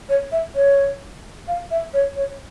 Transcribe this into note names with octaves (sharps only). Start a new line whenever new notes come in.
C#5
E5
C#5
F5
E5
C#5
C#5